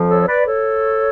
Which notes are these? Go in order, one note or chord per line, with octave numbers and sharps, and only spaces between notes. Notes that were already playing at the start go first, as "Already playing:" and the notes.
Already playing: F2 F3
A4 C#5
C#5
B4 D5
A4 C#5